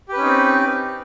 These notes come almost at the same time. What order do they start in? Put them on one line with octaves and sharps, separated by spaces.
G4 B4 C#4 D#4 C4